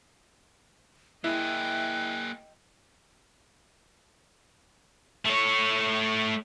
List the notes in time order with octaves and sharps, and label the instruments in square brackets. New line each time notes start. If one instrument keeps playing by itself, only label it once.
[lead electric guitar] A#3 G#4 [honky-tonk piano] E4 [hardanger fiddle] D#5 G5 [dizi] F#6
[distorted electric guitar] A3 C#5